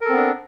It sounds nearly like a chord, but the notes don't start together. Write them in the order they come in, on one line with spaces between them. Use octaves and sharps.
A#4 A4 C4 B3 D4